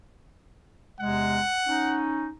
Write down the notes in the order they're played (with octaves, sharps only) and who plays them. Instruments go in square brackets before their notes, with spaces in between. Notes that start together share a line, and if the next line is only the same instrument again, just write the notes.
[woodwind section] E2 C3 G#3 [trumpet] F#5
[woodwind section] C#4 D#4